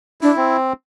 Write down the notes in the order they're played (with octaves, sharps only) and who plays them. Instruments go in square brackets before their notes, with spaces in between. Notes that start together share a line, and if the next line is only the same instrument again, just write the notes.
[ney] D4 [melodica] E4
[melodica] C4